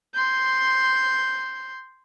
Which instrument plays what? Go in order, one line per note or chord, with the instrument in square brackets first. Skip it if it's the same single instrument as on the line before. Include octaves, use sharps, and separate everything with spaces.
[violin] C6 G6